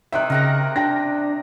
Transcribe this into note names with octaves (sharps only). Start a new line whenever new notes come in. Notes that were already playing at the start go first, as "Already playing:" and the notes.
C3 D#3 E5 F#6
C#3 A#4 F#5 A#5
D4 G5 A#6